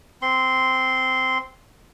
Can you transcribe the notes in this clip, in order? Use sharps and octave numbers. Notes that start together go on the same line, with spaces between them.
C4 C6